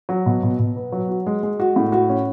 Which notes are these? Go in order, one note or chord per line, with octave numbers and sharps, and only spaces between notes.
F#3
B2
B2
B2
B3
F#3
F#4
G#3
G#3
F#4
A2
F#4
C#4